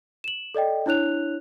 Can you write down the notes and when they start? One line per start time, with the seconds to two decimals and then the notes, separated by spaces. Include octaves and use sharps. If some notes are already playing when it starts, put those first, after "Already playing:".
0.24 E7 F#7
0.55 A4 D5 D#5 G5
0.86 D4 E4 C#5 F#6 F7